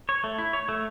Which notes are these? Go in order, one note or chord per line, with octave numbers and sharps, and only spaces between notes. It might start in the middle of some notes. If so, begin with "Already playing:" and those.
C#5
A3
E4
C#5
A3